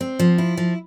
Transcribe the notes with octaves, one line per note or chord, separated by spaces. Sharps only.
C4
F3
E4
F3